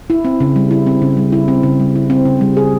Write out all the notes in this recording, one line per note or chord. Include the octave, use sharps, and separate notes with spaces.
E4
C4
C#3
G3
E4
C4
C#3
G3
E4
C4
C#3
G3
E4
C4
C#3
G3
G#4